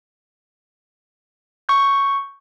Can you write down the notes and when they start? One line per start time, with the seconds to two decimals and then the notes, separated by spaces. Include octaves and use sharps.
1.69 C#6 G6